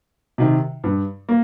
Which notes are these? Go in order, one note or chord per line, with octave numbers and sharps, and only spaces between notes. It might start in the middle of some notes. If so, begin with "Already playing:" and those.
C3 D#3
G2
A#3